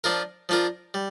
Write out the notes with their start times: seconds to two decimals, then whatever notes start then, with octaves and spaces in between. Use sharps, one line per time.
0.04 F3 D4 F4 A#4
0.49 F3 D4 F4 A#4
0.94 G3